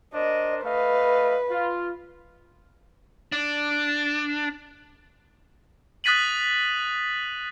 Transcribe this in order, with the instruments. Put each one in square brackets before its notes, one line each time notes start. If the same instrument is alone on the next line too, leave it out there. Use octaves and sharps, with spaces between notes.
[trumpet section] D4 A#4 C5 [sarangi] D#5
[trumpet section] A3 D#5 F5 [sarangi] B4
[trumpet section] F4
[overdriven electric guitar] D4
[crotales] D#6 F#6 A6 B6 D#7 F#7